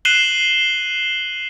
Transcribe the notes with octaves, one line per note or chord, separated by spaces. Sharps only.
F#6 C7 D#7 E7 F#7 G7